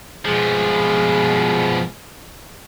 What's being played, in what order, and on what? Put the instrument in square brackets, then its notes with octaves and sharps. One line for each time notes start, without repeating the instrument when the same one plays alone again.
[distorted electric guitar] B2 F3 [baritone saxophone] G#3